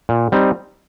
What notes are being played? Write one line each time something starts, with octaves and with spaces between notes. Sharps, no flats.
A#2
G3 C4 D#4